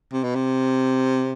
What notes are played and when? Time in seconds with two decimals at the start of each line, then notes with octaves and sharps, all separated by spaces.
0.13 C3
0.24 B2
0.35 C3